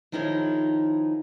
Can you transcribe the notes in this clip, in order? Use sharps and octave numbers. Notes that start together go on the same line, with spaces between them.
D#3 F3 D#4 E4 G#4 C#5